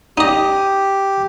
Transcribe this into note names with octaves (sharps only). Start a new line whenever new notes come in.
D#4 G4 D#5